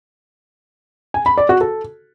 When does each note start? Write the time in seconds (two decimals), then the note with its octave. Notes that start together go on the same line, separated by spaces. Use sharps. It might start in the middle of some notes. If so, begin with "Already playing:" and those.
1.14 G#5
1.26 B5
1.38 D5
1.49 F#4
1.61 A4